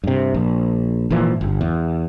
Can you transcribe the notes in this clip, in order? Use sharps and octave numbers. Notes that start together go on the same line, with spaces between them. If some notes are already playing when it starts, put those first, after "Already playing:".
G2 C3
A#1
G#1 A#2 E3 F3
G1
E2